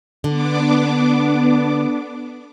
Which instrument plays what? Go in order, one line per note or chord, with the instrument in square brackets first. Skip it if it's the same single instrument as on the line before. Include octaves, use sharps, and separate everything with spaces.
[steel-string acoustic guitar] D3 [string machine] B3 D4 D6